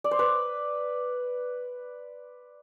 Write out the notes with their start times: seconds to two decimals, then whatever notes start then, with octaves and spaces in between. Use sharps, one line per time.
0.04 D5
0.11 C5
0.19 B4